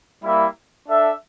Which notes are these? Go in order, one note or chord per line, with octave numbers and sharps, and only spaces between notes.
G3 A#3 E4
D4 A4 E5